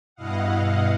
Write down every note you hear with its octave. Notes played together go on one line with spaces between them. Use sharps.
G2 B2 E4 D#5 F5 F#5